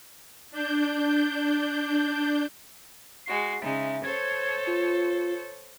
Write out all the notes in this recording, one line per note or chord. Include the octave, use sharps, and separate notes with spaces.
D4 G6
G#3 F#4 C7
C#3 G#3 D#4 E5
A4 C5 C#5 G#6
F4